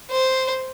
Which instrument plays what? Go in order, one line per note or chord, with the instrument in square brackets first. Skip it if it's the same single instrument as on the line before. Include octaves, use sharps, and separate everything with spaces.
[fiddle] C5